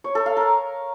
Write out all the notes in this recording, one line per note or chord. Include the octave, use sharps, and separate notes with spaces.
C#5
A4
F5
A#4